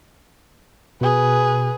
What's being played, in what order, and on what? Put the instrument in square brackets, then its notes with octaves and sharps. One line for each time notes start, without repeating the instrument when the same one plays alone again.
[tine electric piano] B2 [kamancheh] G#4 B4